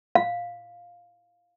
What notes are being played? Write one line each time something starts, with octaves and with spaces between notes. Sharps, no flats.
F5